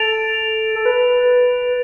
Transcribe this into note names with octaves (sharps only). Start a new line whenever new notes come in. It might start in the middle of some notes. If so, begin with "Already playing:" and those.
Already playing: A4 A6 D7 F7
A4
B4